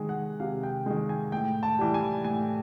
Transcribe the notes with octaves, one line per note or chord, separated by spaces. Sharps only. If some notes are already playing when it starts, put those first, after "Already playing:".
Already playing: C3 D#3 G#3 G#5
F#5
C3 F5
G5
D#3 G#3
G#5
A2 G5
A5
E3 G3
G#5
A2 G#5